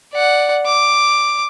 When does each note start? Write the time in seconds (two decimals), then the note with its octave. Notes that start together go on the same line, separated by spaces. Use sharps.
0.12 D5 F#5
0.66 D6